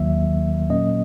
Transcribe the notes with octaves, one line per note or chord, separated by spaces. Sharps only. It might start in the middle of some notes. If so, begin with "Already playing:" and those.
Already playing: D#2 D#3 F#3 A#3 E5
A#2 F#3 A#3 C#4 D#5